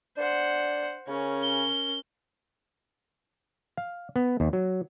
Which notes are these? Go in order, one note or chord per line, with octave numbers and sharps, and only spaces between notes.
D4 C5 F#5
C#3 C#4 A#4
G7
F5
B3
D#2
F#3